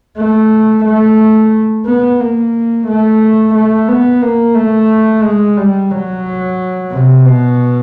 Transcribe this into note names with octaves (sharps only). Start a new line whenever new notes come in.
A3
A3
B3
A#3
A3
A3
B3
A#3
A3
G#3
G3
F#3
C3
B2